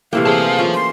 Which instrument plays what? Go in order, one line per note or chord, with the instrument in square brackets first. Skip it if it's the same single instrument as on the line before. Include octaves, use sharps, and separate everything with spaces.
[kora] C3 E3 G5 [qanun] A3 A#3 [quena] F5
[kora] C4 G#4 [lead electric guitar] C5 A5
[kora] C#4 [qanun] F4
[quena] C6